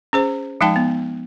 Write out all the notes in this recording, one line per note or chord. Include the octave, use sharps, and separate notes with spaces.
C#4 G#4 C5
F3 G#3 D#4 G5 A5
B3